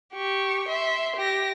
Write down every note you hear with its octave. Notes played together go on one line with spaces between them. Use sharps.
G4 C#6
E5 C6
G4 A#6